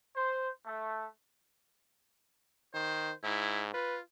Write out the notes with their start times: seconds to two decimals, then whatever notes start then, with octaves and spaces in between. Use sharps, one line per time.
0.16 C5
0.66 A3
2.74 D#3 C5
3.24 G#2 E4
3.74 F4 B4